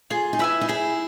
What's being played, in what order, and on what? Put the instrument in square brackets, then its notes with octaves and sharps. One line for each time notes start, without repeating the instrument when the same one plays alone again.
[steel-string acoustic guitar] F4 [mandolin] G#4
[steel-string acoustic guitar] D#4
[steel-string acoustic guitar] E4 [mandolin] B4 E5 G#5
[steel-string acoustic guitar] D#4
[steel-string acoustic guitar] E4 [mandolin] G#4